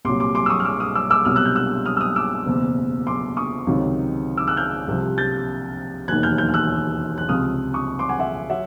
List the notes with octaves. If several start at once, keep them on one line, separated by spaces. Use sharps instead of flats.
C2 A#2 F#3 C6 D6
C6 D6
C6 D6
E6
C#6 D#6
F6
D6 E6
D#6 F6
D6 E6
D6 E6
C2 B2 F#3 D#6 F6
E6 F#6
F6 G6
E6 F#6
D#6 F6
E6
D#6 F6
D6 E6
F#1 E2 B2
C6 D6
C#6 D#6
C#2 C3 D#3 F#3
D6 E6
E6 F#6
F6 G6
C2 C3 F3
G6 A6
E1 D#2 D#3 F#6 G#6
F6 G6
F6 G6
F6
E6 F#6
F#6
C#2 C3 F3 D#6 F6
C#6 D#6
C6 D6
F#5 G#5
E5 F#5
F#3 E5 F#5